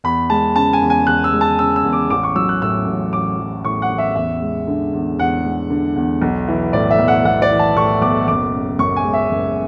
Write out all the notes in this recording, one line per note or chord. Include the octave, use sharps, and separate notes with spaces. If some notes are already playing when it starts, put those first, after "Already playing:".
E2 B5
G#3 A5
C#3 A5
G#5
E2
G#5
E2 F#6
E6
G#3
A5
C#3 E6
E6
E2
D6
A1 D6
C#6
F#3 E6
F#6
A2 E6
A1
A1 D6
F#3
A2 C#6
F#5
A1
E5
E2 E5
G#3
D3
E2
E2 F#5
G#3
D3
E2
B1
E3
A2 D5
E5
B1
F#5
B1 F#5
D5
E3
A5
A2 C#6
B1 D6
F#1 D6
C#3
F#2 C#6
G#5
G#3
E5
F#1